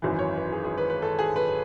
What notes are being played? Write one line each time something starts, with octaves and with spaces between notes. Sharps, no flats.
G#1 F#2 E3
C#5
B4
G#4
G#4
B4
B4
A4
G#4
B4